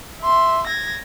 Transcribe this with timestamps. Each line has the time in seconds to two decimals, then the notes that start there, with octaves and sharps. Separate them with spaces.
0.22 E5 C6
0.66 G#6 A#6